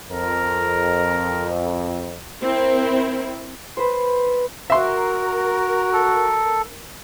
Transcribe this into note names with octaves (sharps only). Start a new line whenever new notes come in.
F2 A#4
C4 E4 A#4
B4 C5
F#4 A#4 E5 C6
A4